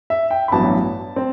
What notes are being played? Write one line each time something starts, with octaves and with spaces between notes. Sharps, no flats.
E5
G5
B5
A1 G2 F#3 B3 A5
C4